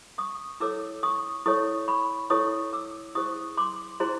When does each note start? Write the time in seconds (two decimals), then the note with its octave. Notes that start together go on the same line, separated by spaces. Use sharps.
0.18 C#6 D#6
0.60 E4 A4 C#5 D6 E6
1.03 C#6 D#6
1.46 E4 A4 C#5 C#6 D#6
1.88 B5 C#6
2.30 E4 A4 C#5 C#6 D#6
2.73 D6 E6
3.15 E4 G#4 C5 C#6 D#6
3.57 C6 D6
4.00 E4 G#4 C5 A#5 C6